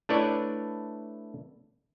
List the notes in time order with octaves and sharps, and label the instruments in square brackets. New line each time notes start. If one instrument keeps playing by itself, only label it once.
[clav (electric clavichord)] A3 D4 E4 B4 C#5 D5